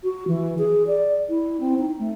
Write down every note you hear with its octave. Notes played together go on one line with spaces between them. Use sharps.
F#4
E3
G#4
D5
E4
C4
D#4
A3